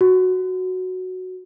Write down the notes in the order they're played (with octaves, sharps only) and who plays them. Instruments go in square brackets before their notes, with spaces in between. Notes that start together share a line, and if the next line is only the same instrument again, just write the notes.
[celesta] F#4